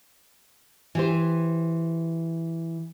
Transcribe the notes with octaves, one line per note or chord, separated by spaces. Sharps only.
E3 G4 C5